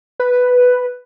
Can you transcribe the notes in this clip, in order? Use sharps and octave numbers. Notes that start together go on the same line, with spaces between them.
B4